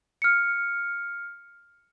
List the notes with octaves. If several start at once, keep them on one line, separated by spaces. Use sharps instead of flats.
F6 C#7